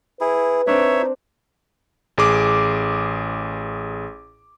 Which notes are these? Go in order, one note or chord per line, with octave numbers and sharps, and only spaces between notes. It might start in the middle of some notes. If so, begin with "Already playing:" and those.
E4 G#4 B4
C4 D4 D#4 C#5 E5
A1 G#4 D6